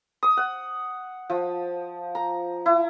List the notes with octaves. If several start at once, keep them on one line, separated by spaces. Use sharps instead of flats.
D#6
F#5
F3
A#5
E4